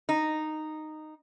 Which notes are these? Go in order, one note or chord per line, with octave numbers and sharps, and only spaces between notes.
D#4